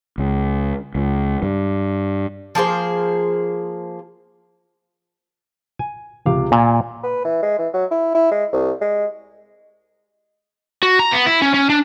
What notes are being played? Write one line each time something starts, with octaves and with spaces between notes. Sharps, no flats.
C#2
C#2
G2
F3 A#3 G#4 C5
G#5
C#2 C3 F5 D6
A#2 G#5
B4
E3
G#3
E3
F#3
E4
E4
G#3
C2
G#3
F#4
A#5
B3
E4
C#4
C#4
D4